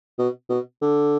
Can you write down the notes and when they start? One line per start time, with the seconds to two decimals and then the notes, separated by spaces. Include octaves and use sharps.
0.18 B2
0.49 B2
0.82 D3